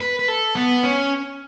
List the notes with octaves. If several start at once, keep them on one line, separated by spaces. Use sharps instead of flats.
B4
B4
A4
B3
C#4